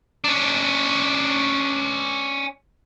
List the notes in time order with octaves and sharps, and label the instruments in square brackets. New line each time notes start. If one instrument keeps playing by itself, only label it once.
[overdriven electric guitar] C#4 D4